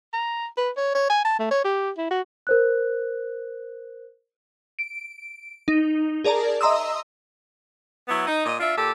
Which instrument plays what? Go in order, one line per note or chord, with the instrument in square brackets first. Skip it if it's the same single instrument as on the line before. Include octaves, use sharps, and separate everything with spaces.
[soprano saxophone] A#5
B4
C#5
C#5
G#5
A5
A3
C#5
G4
E4
F#4
[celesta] A#4 C5 F#6
[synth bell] D7
D#4
G#4 A#4 D5 A5 A#5
D#5 E5 A#5 C6 D#6 E6
[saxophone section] F#3 B3 E4
D#4
A#2 D#5
D4 F4 E5
A#2 G4 A4